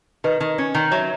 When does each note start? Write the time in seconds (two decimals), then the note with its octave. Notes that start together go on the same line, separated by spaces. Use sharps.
0.24 D#3 B4 D#5
0.40 D#3
0.58 C#4
0.75 D#3
0.91 F#3 C#5 E5